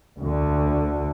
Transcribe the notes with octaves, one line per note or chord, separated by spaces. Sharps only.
D2 D3